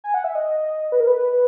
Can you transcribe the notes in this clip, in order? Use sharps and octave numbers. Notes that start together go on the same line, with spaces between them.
G#5
F#5
E5
D#5
B4
A#4
B4